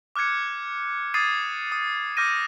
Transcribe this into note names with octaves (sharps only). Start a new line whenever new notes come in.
D6 F6 F#6 G#6 C#7
D6 D#6 G#6 A6 C7 D#7
D#6
D6 F6 G6 A#6 D#7